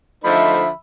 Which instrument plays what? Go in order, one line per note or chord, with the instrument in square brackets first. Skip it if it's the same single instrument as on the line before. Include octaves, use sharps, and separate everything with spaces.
[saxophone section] D3 F3 [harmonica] A3 D#4 C5 [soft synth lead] E5 [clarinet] B5